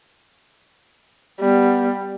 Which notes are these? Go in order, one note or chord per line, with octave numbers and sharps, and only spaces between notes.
G3 B3